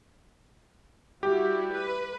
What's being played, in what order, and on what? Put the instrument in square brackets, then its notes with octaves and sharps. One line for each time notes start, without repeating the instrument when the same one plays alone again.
[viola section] G3 E4 F#4 [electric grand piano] G4
[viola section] B4